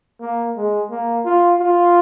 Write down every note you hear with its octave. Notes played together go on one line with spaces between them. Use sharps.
A#3
G#3
A#3
F4
F4